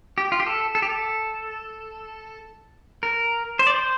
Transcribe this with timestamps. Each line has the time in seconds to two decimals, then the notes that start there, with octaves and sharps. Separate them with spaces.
0.18 G4
0.32 F4
0.40 G4
0.46 A4
0.75 A4
0.82 G4
0.89 A4
3.03 A#4
3.59 C5
3.67 D5
3.74 C5